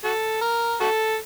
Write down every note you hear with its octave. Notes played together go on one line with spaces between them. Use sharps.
F#4 A4
A#4
F#4 A4